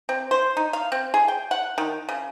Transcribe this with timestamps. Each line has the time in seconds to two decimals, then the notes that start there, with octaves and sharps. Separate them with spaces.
0.09 C4
0.31 C5
0.57 D#4
0.73 F5
0.92 C4
1.14 G#4
1.28 G5
1.51 F#5
1.78 D#3
2.09 C#3